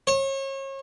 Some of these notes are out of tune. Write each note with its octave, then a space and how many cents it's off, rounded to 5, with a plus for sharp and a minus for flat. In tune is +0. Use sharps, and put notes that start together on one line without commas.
C#5 -35